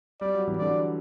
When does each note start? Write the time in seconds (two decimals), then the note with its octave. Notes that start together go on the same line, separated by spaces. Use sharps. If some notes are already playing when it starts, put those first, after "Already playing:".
0.21 G3 D5
0.34 F#3
0.48 E3
0.57 D3 F#3 D5